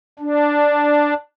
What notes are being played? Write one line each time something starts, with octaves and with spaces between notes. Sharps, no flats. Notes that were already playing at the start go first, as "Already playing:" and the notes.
D4